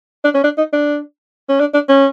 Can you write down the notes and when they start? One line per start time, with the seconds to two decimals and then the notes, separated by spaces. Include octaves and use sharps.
0.24 D4
0.34 C#4
0.44 D4
0.58 D#4
0.73 D4
1.49 C#4
1.60 D4
1.74 D4
1.89 C#4